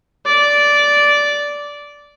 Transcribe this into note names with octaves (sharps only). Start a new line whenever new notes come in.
D5